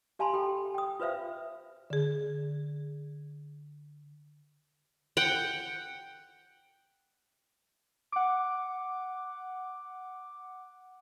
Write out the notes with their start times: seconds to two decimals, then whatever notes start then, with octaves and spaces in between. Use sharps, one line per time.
0.19 G4 F5 G#5 A5 B5 C6
0.33 G4 A4 G5 B5
0.75 G5 D#6
1.00 F4 B4 C5 E5 F5
1.90 D3 G#4
5.17 F#5 G5
8.12 F#5 D6